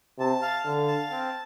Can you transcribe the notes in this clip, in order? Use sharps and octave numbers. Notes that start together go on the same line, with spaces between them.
C3 A5
F5
D3 F5
A5
C4